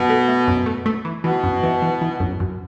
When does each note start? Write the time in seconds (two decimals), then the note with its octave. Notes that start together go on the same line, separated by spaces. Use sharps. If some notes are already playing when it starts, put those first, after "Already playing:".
Already playing: F#2 B2
0.09 A3
0.28 A3
0.48 F#2
0.66 A3
0.86 A3
1.05 E3
1.24 B2 E3
1.44 F#2
1.63 E3
1.82 E3
2.02 E3
2.20 F#2
2.40 F#2